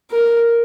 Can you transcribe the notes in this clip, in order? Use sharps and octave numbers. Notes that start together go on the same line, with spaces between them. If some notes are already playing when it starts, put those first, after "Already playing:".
A#4